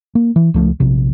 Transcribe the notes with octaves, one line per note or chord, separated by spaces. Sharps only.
A#3
E3
C#2 F3 A3
A#1 C3